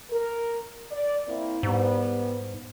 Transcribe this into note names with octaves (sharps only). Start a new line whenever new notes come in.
A#4
D5
A#3 C4 E4
G#2 G3 B3